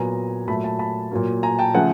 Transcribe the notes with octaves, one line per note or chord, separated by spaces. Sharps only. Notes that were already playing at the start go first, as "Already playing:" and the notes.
Already playing: A#2 F#3 B3 G#5 A#5
A#2 F#3 A3 A5 B5
A5 B5
A5 B5
A#2 F#3 A#3
G#5 A#5
G5 A5
C#3 F3 A3 F#5 G#5